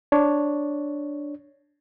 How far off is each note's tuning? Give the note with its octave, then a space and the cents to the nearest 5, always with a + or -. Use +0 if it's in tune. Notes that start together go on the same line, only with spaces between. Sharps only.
D4 +0 C#5 +0